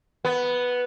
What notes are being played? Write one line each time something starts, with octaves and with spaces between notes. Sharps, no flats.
B3